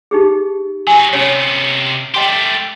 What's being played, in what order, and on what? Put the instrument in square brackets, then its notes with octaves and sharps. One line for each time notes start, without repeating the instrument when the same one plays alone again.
[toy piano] D#4 G4 G#4
[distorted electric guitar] F#3 D#4 [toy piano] G#5
[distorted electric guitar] C3 B3 [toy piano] C#4 C#5
[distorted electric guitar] A3 G4 [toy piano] D#5 G5 C6